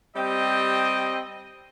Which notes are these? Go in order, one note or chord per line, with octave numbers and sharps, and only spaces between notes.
G3 C4 G4 D#5